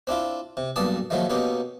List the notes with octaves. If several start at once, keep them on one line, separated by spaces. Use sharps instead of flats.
C4 D4 E4 F4
C3
B1 G2 A#2 D5 A5 D#6
A#2 D#3 F3 F#3 G#3 A3
B2 A#3 C#4 D#4 G4